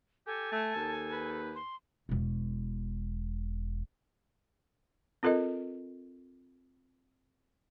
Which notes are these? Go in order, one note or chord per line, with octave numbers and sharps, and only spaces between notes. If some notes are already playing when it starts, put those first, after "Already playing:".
G4 A4 G#5
A3 A5
D#2
B4
C6
E1 B2
C4 F4 A4 A#4 D#5